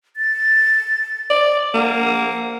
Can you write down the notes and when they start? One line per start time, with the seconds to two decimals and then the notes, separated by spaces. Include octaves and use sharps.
0.17 A6
1.30 D5
1.74 A#3 F#5